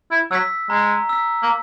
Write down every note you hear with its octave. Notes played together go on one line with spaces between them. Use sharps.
E4
F#3 E6 B6
G#3 A#5
E6 B6
A#3